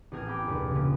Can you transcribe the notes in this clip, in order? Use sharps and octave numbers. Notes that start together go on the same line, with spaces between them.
A1 B3 C4 G#4 A#4 G#6
G5 A#5 B5 D6 A#6 D7
F1 D2 A#2 A#3 B4
C#3 F3